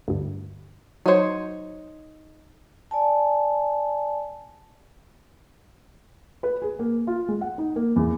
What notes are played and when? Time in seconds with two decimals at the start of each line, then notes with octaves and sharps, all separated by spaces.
0.08 D2 G2
1.06 F#3 D#4 C5 C#5
2.91 D5 G#5 A5
6.43 B4
6.62 G#4
6.79 A#3
7.07 F4
7.28 G#3
7.41 F#5
7.58 D#4
7.76 A#3
7.96 E2